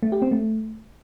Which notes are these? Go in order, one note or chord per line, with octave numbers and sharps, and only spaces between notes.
A3
G4
C4
A3